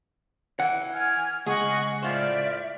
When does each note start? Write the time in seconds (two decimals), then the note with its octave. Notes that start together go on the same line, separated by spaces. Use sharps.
0.60 E3 F#5
0.92 G#5 F6 G#6
1.46 C#2 G#4 D#5 F#5 C#6
2.02 A2 F4 C5 D5 E5 F6